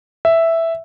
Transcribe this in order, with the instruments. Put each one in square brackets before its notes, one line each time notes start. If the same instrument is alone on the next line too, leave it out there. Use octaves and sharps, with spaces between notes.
[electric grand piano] E5